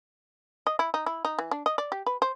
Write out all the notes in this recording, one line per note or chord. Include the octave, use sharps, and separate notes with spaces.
D#5
E4
D#4
E4
D#4
E3
D4
D#5
D5
G4
B4
C5